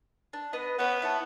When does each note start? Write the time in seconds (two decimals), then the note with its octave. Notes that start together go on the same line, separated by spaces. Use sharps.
0.33 D4
0.53 B3 B4 D#5
0.79 B3 C#4 C#5
1.02 E4 C#5 A5